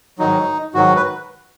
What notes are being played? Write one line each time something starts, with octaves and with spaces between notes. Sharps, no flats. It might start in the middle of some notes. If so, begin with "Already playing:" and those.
G#2 D#3 F#3 D#4
G#2 D#3 F#3 F#4
B4